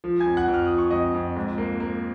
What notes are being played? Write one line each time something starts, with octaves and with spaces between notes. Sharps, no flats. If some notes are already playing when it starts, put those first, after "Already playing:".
F3
G#5 G#6
F2
F#5 F#6
F2
F6
F3 D#6
C#6
F2 D#5 D#6
F2
G#2
A#3
A#3